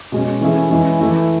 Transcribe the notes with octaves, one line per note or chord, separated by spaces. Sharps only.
B2 G#3 C#4
E3 A3 C#4 E4 G#4
E3 G#3 C#4 E4
E3 A3 E4